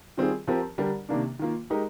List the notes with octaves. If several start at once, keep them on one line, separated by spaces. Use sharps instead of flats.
D#3 G3 C4 F4 G#4
F3 C4 G4 A#4
D3 G3 D4 G4 A#4
C3 D#3 A#3 D4
D#3 A#3 F4
G#3 D#4 G4 A#4